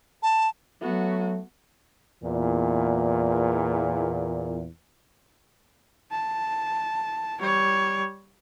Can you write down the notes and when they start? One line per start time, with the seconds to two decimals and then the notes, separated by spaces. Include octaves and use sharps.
0.23 A5
0.82 F#3 A3 B3 F#4
2.24 E2 A#2
6.11 A5
7.40 G3 C#5